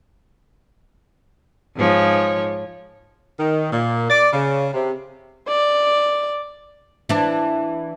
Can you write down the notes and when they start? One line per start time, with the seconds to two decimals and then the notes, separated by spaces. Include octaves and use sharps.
1.76 G#2 F3 C#5
3.40 D#3
3.72 A#2
4.10 D5
4.33 C#3
4.74 C3
5.48 D5
7.09 E3 D4